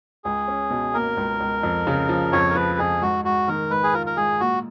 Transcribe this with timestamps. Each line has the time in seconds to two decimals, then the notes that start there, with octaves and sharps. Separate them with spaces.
0.25 C#2 G#4
0.48 C#4
0.70 B2
0.94 A#3 A#4
1.17 C#2
1.40 C#2
1.63 F2
1.87 C#3
2.09 F3
2.32 F2 C#5
2.50 A#4
2.55 F3 B4
2.78 F2 G#4
3.02 G#2 F#4
3.25 G#2 F#4
3.48 D#3 A#4
3.70 G#2 B4
3.83 G#4
3.94 F4 A#4
4.06 A#4
4.17 G#2 G#4
4.40 A#2 F#4